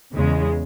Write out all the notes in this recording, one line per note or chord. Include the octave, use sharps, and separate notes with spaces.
E2 C#3 G#3